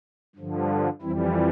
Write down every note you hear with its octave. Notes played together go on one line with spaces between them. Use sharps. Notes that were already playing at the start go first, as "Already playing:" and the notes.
G2 D3 F3
F2 E3 G3 C4 E4